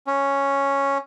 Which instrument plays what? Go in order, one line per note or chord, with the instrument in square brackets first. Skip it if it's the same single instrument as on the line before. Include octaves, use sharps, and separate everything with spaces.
[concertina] C#4